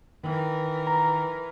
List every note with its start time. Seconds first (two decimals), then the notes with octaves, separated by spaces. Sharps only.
0.23 D#3 E3 A#4
0.87 A#5